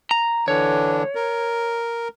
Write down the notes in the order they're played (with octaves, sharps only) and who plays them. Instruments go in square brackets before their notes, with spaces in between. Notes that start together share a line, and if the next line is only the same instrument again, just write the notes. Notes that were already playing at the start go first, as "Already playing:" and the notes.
[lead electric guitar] A#5
[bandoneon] D3 E3 D4 [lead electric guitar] C#5
[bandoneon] A#4